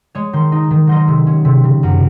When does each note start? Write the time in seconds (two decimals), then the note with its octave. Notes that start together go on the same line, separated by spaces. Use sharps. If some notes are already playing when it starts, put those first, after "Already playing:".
0.15 G#3 C#5
0.33 D#3 C5
0.52 D#4
0.71 D#3
0.87 F#3 C5 D#5
1.08 C3
1.27 C#4
1.45 C3
1.64 C#3
1.83 F#2